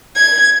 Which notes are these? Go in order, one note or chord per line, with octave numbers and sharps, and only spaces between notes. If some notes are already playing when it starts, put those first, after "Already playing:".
G#6